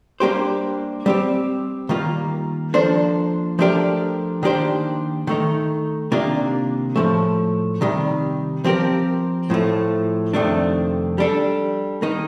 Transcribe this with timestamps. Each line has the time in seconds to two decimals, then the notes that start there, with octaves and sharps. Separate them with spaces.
0.20 G3 A#3 D4 G4 C5
1.06 G3 C4 G4
1.89 D#3 G3 A#3 F4
2.74 F3 A#3 D4 A4 C5
3.59 F3 A3 D4 G4 A#4
4.43 D#3 A#3 D4 G4 C5
5.27 D#3 A3 D#4
6.12 C3 D#3 A#3 D4 F4
6.96 A2 F3 A3
7.81 C3 D#3 G3
8.64 F3 C4 G4 A#4
9.50 A2 F3 A3
10.33 F2 C3 D#3 A3 D4
11.18 G3 D4 A4
12.02 D#3 A#3 D#4